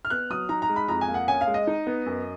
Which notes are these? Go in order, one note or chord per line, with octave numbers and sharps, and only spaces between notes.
F6
B3 F#6
F#3 D#6
D#4 A#5
A#5
G#3
B5
F2 A#5
G#5
A#3
F#5
C#4 G#5
F5
G#3
D#5
D#4
B3
F#2